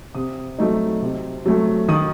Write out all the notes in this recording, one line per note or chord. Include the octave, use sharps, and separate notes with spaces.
C3 D#6
F#3 A3 D#4
C3
F#3 A3
D#3 D#6